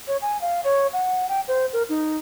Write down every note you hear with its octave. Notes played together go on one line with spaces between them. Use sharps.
C#5
G#5
F5
C#5
F#5
G5
C5
A#4
D#4